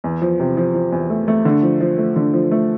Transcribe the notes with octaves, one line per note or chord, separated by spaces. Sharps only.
E2
F3
C3
F3
F3
E2
A3
A3
D3
F3
F3
A3
D3
F3
A3